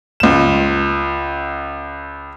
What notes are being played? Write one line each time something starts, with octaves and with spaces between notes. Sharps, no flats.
C#2 E7